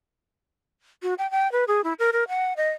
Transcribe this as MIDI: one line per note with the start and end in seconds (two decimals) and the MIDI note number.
1.03 1.14 66
1.18 1.29 79
1.31 1.50 79
1.52 1.64 71
1.68 1.81 68
1.84 1.93 64
1.99 2.11 70
2.13 2.24 70
2.28 2.53 78
2.57 2.71 75